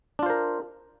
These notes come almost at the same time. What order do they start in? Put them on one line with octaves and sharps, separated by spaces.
D4 F4 C5 A#4